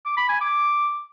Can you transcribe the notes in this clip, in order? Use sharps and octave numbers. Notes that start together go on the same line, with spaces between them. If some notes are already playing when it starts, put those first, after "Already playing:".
D6
B5
G#5
D6